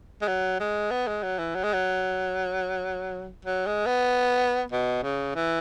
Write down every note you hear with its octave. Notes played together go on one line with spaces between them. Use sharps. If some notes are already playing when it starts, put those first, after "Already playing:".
G#3
F#3
G#3
B3
G#3
F#3
E3
F#3
G#3
F#3
F#3
G#3
B3
B2
C#3
E3